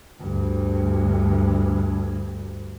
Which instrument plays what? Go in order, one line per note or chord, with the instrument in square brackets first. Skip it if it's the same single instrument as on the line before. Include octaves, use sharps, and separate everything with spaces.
[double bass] D2 G2